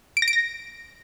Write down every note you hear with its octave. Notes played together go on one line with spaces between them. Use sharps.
D7
A#6
D7
A#6